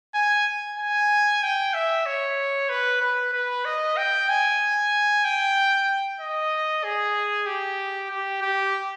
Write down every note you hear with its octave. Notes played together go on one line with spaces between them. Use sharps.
G#5
G#5
G5
E5
C#5
B4
B4
B4
D#5
G5
G#5
G5
D#5
G#4
G4
G4
G4